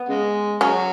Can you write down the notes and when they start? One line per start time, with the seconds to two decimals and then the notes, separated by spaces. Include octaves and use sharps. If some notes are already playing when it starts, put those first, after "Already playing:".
Already playing: B3
0.08 C#3 G#3
0.61 C#3 F#3 C#4